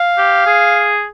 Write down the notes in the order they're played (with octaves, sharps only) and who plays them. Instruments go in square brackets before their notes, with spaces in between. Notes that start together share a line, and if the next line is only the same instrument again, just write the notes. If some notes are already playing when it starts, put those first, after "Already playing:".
Already playing: [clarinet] F5
[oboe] G4
G#4